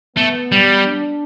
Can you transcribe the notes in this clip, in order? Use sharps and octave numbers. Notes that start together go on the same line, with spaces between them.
A3 B3
G3
D4